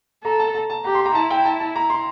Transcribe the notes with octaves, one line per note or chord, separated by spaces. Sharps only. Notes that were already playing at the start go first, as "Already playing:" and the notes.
A4 A#5
A5
A5
A5
G4 A#5
C6
A#5
E4 A5
G5
A5
A5
A#5
C6